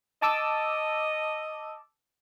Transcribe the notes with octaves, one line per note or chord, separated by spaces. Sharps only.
D#5 A5 D6 E6